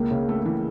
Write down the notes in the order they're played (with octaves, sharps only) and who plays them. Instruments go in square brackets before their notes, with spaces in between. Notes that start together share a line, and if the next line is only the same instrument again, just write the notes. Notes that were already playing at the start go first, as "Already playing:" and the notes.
Already playing: [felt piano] C#2 [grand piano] A#3
[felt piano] C#3
A3
E3